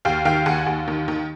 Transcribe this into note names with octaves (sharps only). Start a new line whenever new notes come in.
D#2 F5 G5
D#3 F5 G5
D#2 F#5 G#5
D#2
D#3
D#3